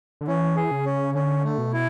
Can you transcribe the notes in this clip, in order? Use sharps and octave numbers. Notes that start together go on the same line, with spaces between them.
D3
E3 C#4
G#4
C#3
C#4
D3 C#4
A3
B2
E4